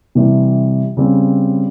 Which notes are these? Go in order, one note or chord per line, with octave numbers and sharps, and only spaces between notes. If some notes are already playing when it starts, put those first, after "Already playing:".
C3 E3 G3
C#3 G3 C4